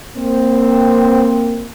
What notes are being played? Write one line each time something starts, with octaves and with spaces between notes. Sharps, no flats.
A#3 C4